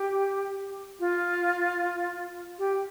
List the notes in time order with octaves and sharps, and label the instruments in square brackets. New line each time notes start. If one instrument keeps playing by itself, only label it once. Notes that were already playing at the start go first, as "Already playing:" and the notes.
Already playing: [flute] G4
F4
G4